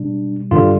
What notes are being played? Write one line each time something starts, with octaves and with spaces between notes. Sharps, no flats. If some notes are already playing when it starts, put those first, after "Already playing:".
Already playing: B2 G3 D4
G2 D3 G3 F4